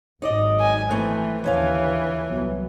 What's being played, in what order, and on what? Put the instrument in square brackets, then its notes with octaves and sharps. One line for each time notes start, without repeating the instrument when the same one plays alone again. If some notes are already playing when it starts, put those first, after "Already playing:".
[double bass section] G#1 G#2 F#3 [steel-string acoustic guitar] D#4 D5 D#5
[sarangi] G#5
[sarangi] E3 [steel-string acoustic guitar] A3 C4
[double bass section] D#2 D3 [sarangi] E3 [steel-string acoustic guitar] F3 C#4 F5
[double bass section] C2 F#3 B3